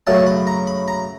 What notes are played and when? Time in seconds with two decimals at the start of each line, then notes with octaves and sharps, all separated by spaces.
0.07 F#2 C#3 F#3 A3 A5
0.27 B5
0.47 A#5
0.67 B5
0.88 A#5